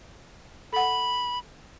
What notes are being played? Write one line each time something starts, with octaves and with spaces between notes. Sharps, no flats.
A4 F#5 B5